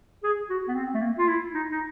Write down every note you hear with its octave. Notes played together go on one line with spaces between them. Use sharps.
G#4
F#4
B3
C4
A3
A#3
F4
E4
D#4
D#4